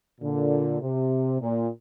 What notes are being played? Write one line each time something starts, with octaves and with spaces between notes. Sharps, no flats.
A#2 D3
C3
A#2